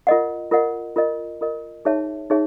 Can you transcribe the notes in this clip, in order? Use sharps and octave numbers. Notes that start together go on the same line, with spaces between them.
F4 A#4 D#5 F#5
F4 A#4 D#5 F#5
F4 A#4 D#5
F4 A#4 D#5
D#4 G#4 C#5 E5 A5
D#4 G#4 C#5 E5 A5